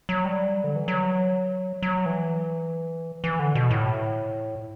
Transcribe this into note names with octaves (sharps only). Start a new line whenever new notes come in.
F#3
G3
D3
E3
F#3
F#3
E3
E3
D3
B2
A2